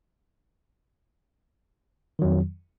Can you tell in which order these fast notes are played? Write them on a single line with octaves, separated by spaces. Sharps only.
D#3 F#3 F2